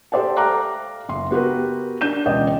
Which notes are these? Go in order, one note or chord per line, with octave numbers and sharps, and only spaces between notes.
G4 A4 C5 D5 G5 A5
E5 F5 A#5 D6 F#6
F#1 C6
B3 F#4 G4 A#4 B4
D4 G6 E7
E1 C#2 D5 D#5 G5